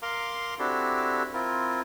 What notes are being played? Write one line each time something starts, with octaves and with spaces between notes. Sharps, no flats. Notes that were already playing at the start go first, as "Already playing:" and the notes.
A#4 F5 A#5 C6 D6
C4 D4 E4 F#4 G4 A4
C4 E4 F4 A#4